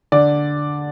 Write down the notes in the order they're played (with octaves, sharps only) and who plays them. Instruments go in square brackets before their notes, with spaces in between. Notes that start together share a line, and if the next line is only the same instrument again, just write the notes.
[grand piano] D3 D5